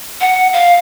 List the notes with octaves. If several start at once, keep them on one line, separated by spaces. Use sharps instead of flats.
F#5
F5